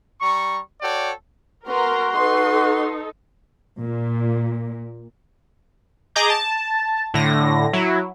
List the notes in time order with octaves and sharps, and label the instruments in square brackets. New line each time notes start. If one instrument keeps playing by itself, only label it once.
[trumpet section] G3 A#5 C#6
F#4 A4 C#5 D5 G5
[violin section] B3 [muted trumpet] F#4 [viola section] A#4 A#5 C6
[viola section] D#4 A4 [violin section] B4 C6
[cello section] A#2
[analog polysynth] G#4 D#5 A#5 D6 G6
A5
A2 D3 A#6
F#3 E4